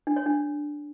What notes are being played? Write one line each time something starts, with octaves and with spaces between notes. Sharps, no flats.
D4
C#5
D4